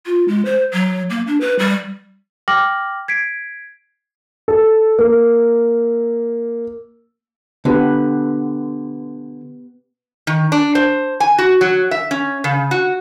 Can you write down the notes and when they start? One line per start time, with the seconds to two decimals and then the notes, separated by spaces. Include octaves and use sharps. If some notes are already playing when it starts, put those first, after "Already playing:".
0.06 F4
0.28 G#3
0.45 C5
0.73 F#3
1.10 A#3
1.27 D4
1.41 B4
1.59 G3
2.48 G5 D6 F6 A#6 F#7
3.08 G#6 B6 C7 D7
4.48 A4
4.99 A#3
7.65 D3 B3 G4 B4
10.27 D#3
10.52 D4
10.75 C5
11.20 G#5
11.38 F#4
11.61 F#3
11.91 E5
12.11 C#4
12.44 C#3
12.71 F#4